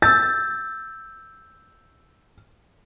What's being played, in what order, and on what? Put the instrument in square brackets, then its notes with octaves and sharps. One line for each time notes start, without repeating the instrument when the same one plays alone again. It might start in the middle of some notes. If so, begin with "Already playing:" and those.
[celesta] E6 G6 [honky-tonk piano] A6